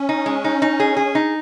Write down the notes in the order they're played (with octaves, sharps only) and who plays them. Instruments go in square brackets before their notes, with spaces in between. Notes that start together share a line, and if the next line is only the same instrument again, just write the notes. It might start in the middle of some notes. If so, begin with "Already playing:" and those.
Already playing: [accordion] C#4
[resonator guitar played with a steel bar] D#4
G#3
D#4
D#4
G#4
G#4
D#4